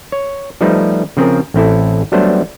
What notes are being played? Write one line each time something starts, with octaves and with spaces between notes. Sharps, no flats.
C#5
F3 G3 A3 D#4 B4
C#3 F3 C4 G#4 A#4
A1 C4 E4 A4
F#3 G3 A3 B3 D4 C5